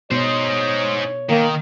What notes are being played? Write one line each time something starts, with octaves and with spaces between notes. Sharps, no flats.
B2 D#4 C5 C#5
D#3 A#3